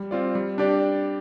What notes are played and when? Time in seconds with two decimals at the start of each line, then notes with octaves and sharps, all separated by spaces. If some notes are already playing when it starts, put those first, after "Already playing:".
Already playing: G3
0.11 C4 F4 D5
0.35 G3
0.58 D4 G4 D5